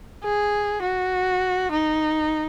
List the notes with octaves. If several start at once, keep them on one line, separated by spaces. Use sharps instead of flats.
G#4
F#4
D#4